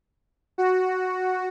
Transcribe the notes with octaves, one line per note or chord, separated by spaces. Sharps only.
F#4